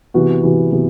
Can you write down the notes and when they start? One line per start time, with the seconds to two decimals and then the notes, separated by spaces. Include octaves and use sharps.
0.14 C3 E3 B3 F#4
0.43 C3 E3 B3 F#4
0.72 C3 E3 B3 F#4